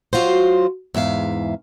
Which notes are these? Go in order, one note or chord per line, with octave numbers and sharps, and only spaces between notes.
F#3 F4 F#4 C5
E2 G#2 E5 F5